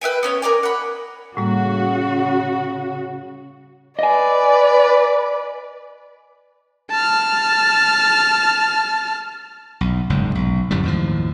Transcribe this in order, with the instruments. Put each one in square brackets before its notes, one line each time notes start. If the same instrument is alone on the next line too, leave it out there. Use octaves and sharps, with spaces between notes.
[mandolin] B4 E5 G5 G#5
B3 C#4 C#5
A#4 B4 D5 G#5
F#5 B5
[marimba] A2 G3 A#3 [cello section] C#3 F#4
[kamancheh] B4 D5 [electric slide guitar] D#5 G#5
[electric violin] A5 F6
[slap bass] B1
F#1 C#2 G#2
B1
G1 F#2 A2 G3
D#2 A2 F3